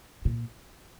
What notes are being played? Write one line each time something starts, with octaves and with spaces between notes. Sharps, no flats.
A#2